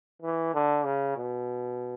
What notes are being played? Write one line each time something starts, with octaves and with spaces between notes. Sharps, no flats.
E3
D3
C#3
B2